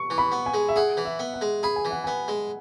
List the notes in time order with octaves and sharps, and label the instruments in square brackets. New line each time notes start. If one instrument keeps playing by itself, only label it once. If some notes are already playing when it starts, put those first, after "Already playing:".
Already playing: [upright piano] C#6
[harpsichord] E3
[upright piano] B5
[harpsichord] B3
[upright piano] G#5
[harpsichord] G#3
[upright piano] E5
[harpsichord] G#4 [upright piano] F#5
[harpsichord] E3
[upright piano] E5
[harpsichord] B3
[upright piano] F#5
[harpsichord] G#3
[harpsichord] G#4 [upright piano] B5
[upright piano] G#5
[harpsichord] E3
[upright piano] F#5
[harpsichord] B3 [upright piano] G#5
[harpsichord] G#3